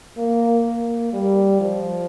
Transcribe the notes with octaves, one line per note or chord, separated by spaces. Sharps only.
A#3
A#3
G3
F3